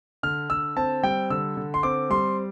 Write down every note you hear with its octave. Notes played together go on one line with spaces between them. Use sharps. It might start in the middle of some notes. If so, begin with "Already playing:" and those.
D3 F6
D3 E6
C4 A5
G3 G5
D3 E6
D3
C6
C4 D6
G3 C6